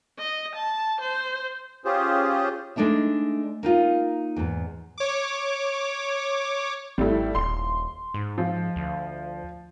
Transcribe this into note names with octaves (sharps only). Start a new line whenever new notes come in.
D#5
A5
C5
C#4 F4 G4 G#4 C5
G#3 A3 D4 D#4 E5
A#3 D#4 F4
E2 G#2
C#5 D6
G#1 G3 A3 E4
D#1 C6
G#2
F3
D2